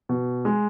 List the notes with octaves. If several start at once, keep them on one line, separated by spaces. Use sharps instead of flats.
B2
G#3